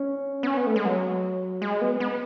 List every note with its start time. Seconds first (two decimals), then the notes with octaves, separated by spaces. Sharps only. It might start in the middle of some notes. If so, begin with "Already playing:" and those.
Already playing: C#4
0.43 B3
0.47 C#4
0.57 B3
0.67 A3
0.76 G#3
0.85 F#3
1.62 G#3
1.82 B3
2.00 B3